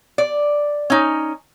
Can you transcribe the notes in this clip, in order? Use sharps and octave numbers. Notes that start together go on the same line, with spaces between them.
D5
C#4 D#4